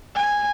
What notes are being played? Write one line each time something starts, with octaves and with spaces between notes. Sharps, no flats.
G#5